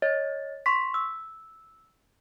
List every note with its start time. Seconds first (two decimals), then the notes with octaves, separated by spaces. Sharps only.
0.02 C#5 D#5 A6
0.66 C6 C#6 B6
0.94 E6